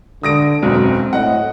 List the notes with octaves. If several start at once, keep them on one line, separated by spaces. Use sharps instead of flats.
D3 D#6 A#6 D7
E1 B1 F#2 C4
A2 D#5 F#5